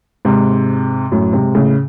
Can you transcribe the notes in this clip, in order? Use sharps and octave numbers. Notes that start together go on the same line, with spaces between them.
G#2 C3
F#2 A2
G#2 C3
A2 C#3